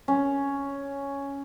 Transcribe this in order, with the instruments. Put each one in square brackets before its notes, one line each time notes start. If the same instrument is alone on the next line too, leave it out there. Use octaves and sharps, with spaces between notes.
[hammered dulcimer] C#4